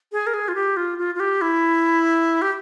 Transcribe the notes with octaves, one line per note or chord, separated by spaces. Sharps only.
G#4
A#4
G#4
F4
G4
F4
F4
F4
G4
E4
G4